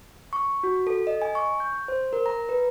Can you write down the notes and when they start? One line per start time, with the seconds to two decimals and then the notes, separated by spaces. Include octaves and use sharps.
0.33 C#6
0.63 F#4
0.87 A4
1.07 D#5
1.22 G#5
1.35 C#6
1.60 G6
1.88 C5
2.13 A#4
2.26 A#5
2.49 B4